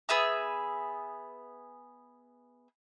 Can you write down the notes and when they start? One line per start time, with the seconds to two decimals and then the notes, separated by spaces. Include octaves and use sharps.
0.09 B3 G#4 E5 E6